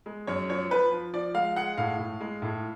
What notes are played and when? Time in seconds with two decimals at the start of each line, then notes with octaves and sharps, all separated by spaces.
0.06 G#3
0.27 F#2 C#5
0.49 F3 C#5
0.71 F3 B4
0.92 F3
1.13 F3 D5
1.34 G#3 F5
1.56 G#3 F#5
1.78 A2 F5
1.99 A2
2.21 G#3
2.42 A2